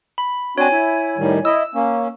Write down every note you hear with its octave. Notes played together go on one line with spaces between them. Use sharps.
B5
C4 D4 F#4 C#5 G#5
E4
A2 D#3 G3
E4 D#5 E6
A#3 C#4